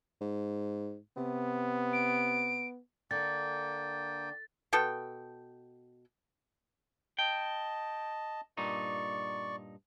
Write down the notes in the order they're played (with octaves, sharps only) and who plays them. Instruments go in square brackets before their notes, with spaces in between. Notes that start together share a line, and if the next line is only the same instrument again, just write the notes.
[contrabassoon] G#2
[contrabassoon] C3 [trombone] B3
[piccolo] D7
[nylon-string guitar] D3 [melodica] A#3 G5 [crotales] A6
[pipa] B2 A4 G5
[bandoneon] D#5 A5 [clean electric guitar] G5
[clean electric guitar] G2 A#2 D#4 [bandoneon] D5 C#6